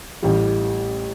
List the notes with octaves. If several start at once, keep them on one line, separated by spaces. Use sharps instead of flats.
A1 A2 E3 G3